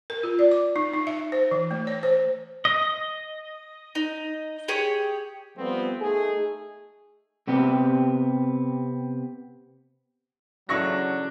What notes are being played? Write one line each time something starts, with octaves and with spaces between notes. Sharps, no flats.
A#4
F4
D5
D6
D#4
D#4
E5
C5
E3
A3
C#5
C5
D#5
D#4
G4 G#4 C#5
F3 G3 A3 B3 C4
A3 D#4 G#4
C3 B3 C4 G4
C#3 E3 F#3 A3 D4 C#6 A#6